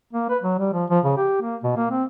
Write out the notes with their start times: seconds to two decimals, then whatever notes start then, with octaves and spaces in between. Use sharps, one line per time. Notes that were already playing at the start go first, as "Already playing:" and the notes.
0.13 A#3
0.29 B4
0.43 F#3
0.59 G3
0.73 F3
0.90 F3
1.04 C#3
1.17 G4
1.42 A#3
1.64 B2
1.77 A#3
1.91 C4